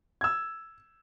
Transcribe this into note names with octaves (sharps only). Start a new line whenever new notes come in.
E6 G#6